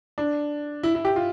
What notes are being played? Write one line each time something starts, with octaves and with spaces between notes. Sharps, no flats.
D4
E4
E4
G4
F4